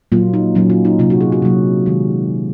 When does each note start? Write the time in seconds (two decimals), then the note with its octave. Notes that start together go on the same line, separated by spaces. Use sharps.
0.12 A#2 F#3 A#3 F4
0.34 D#4
0.55 A#2 F#3 A#3 C#4
0.70 F4
0.85 D#4
0.99 C3 F#3 A#3 F4
1.10 F#4
1.21 G#4
1.32 F#4
1.42 C3 F#3 A#3
1.86 D#3 G#3